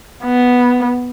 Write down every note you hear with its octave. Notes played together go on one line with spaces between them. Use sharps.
B3